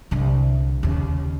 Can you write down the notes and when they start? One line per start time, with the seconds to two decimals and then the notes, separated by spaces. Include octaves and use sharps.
0.11 C2 D3
0.83 D#2 C#3